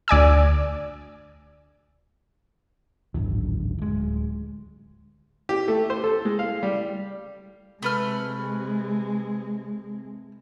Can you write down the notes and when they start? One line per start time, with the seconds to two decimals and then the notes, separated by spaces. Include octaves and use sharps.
0.08 D2 D5 G#5 E6
3.14 D1 G#1 F#2 D3
3.78 D1 G#3
5.49 G4
5.68 A3
5.90 C5
6.04 A4
6.25 G#3
6.39 F5
6.63 G3
7.83 C3 G#3 A3 B4 F6